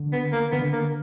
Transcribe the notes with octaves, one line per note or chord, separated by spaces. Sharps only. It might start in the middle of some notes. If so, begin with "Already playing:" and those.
Already playing: D3
B3
A#3
D3 B3
A#3